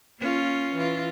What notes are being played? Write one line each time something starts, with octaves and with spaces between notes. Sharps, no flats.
A#3 C#4 F4
E3 F4